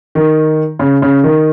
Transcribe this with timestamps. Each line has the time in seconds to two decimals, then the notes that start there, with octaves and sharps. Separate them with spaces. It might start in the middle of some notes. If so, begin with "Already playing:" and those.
0.15 D#3
0.79 C#3
1.02 C#3
1.23 D#3